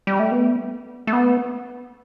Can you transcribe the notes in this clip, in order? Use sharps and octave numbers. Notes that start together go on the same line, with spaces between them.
G3
A3
B3
A3
B3